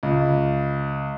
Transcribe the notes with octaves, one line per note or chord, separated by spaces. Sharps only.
C#2